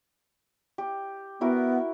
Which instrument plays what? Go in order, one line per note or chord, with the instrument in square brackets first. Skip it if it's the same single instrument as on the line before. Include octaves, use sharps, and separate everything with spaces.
[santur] G4
[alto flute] B3 [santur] E4 F#4 A#4